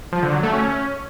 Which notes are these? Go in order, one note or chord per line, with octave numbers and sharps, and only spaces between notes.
F3
D3
F#3
A3
C#4